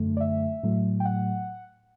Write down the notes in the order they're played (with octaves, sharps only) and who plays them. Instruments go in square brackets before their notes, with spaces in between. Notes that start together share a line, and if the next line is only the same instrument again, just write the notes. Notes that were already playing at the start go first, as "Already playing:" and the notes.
Already playing: [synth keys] F#2 D3 A3
D5
E5
A2 F#3 A3
G5
F#5